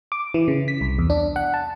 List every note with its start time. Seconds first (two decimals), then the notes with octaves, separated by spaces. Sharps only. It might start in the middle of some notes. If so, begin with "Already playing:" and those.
0.12 D6
0.34 E3
0.48 C#3
0.68 B6
0.81 C2
0.99 E2
1.10 D4
1.36 F#5
1.54 A5